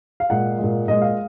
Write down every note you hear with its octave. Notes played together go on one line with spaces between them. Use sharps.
F5
A#2 G#3 F#5
G#3
A#2
A#2 G#3 D#5
F5